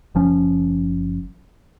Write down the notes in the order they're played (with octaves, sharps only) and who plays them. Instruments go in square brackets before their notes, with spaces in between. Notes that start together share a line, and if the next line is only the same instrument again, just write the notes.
[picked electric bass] F#1 F3 C#4